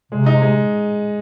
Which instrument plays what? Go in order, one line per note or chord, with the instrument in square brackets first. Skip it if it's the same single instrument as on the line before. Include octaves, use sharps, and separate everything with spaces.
[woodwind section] C3 [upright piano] G#3
[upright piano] D#4
G#3